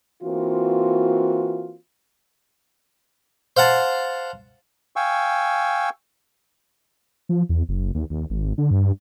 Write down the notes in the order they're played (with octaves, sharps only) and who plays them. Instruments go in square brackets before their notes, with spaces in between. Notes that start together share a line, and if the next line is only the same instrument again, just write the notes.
[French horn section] E3 A#3 C4 F4 F#4
[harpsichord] C5 F5 F#5 A5
[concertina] F5 G5 G#5 C#6 E6
[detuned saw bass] F3
E2
F#1
D#2
D#2
G#1
D3
G2